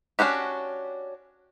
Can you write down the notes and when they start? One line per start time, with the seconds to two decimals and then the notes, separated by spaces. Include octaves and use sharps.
0.19 C#4 D4 F#4 G4